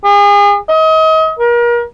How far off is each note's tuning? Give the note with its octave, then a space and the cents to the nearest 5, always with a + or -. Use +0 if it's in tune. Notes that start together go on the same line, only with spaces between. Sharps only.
G#4 -35
D#5 +35
A#4 +35